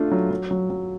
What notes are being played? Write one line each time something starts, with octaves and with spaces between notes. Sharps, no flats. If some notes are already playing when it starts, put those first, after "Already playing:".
Already playing: A3 D4 F4
F#3
F#3
F#3
F#3